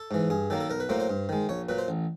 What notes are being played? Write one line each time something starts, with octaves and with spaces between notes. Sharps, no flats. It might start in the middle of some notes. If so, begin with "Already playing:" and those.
Already playing: A4
G#2 E3
G2 G#4
D#3 F#3 A#3 A4
A4
B1 A#4
B4
A2 F#3 A#3 C5
C5
G2
D#3 G#3
A#1 C#5
A#2 F#3 B4
C5
A1